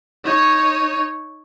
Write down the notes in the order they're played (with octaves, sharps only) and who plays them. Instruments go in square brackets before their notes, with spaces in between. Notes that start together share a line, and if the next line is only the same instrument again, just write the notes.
[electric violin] D#4 C#5